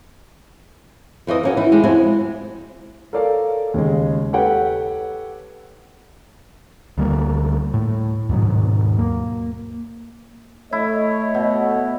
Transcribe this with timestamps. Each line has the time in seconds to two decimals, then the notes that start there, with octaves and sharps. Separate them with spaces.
1.27 F2 E3 C5 D#5
1.43 A#3 C#4 F#4
1.57 E3 D#4 E4
1.72 G#3 G4
1.83 F2 F#3 C4 E4 G#5
3.13 A4 A#4 C#5 D5 F5
3.74 D#2 C#3 G#3
4.33 G4 A4 B4 C#5 F#5 G5
6.98 D2 G3 A#3
7.74 A2
8.29 D#2 G#2 B2 F#3
8.99 A#3
10.72 A3 E4 C#5 D#5
11.34 B2